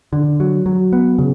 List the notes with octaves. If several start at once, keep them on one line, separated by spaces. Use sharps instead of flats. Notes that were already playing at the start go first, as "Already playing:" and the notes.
D3
F#3
F#3
B3
C#3